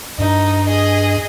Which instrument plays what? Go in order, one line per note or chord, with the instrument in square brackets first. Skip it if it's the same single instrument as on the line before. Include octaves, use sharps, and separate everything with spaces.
[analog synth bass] G2 [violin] D#4
[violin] G#4 D#5